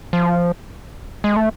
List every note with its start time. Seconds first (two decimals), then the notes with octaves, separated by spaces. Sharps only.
0.13 F3
1.24 G#3
1.36 A3